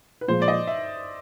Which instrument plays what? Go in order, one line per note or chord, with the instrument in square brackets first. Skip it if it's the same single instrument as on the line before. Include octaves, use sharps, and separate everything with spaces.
[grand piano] B4
[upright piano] A#2 F3 G#3 [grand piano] C5
[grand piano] D5
D#5
E5